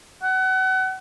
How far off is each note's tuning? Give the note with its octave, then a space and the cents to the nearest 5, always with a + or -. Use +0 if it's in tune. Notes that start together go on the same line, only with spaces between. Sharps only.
F#5 +30